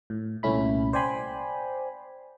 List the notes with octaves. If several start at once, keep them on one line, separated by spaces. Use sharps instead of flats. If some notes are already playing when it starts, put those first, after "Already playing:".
A2
C2 A#2 A3 C#4 E4 B5
C5 D5 G5 G#5 B5 C6